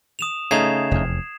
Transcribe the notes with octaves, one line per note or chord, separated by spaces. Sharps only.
D#6 E7 F7
C#3 A3 D#4 G#6 C7 E7
F1 E2